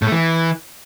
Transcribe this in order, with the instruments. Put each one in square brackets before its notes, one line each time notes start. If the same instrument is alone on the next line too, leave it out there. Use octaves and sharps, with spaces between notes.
[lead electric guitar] A2
A3
E3